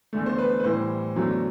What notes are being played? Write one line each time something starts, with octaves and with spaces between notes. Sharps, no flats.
E2 D3 A3
C5
B4
B4
A2 E3 G3 C5
E2 D3 F#3 A3